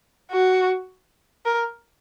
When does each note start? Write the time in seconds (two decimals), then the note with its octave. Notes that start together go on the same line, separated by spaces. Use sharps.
0.31 F#4
1.46 A#4